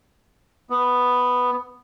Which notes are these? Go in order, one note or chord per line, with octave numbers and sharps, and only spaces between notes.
B3